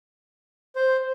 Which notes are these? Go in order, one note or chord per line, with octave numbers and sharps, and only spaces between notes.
C5